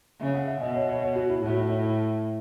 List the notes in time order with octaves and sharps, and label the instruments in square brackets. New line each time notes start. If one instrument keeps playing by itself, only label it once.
[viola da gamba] C#3 [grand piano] E5
[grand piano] F#5
E5
[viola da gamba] B2 [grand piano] D#5
[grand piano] C#5
C#5
C#5
F#4
E4
[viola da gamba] A2 [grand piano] F#4
[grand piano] E4
E4